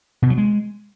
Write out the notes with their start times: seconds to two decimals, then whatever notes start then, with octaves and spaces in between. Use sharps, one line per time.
0.22 B2
0.30 F#3
0.38 G#3